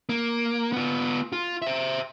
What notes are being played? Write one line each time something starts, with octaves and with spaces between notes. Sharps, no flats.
A#3
B3 F4
F4
C5 E5